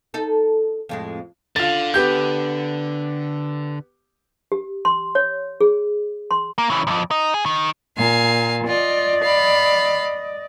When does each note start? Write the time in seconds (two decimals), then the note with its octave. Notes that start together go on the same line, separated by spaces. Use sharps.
0.14 D#4 A4
0.89 F2 A2 G#3
1.56 D3 F4 A6
1.94 B3 G4 G6
4.52 G4
4.85 C6
5.15 C#5
5.61 G#4
6.31 C6
6.58 A#3
6.70 C#3 E3
6.87 B1 F2
7.11 D#4
7.34 G#4
7.46 D#3
7.97 A#2 F5 G#5
8.67 F4 D5 D#5
9.23 F5 B5